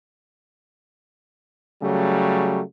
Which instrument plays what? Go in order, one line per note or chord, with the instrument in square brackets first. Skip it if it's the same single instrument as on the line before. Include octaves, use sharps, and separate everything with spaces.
[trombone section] C#3 F#3 G3 A3